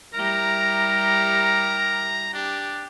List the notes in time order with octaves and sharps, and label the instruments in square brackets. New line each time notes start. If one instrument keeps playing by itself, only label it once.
[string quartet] G3 E4 G4 [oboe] A#4 [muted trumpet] A#5
[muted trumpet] D4 [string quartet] G4